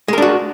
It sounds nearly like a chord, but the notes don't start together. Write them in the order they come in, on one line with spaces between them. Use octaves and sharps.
G#3 A#4 D4 F#4